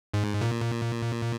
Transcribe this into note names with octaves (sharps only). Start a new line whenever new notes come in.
G#2
A#2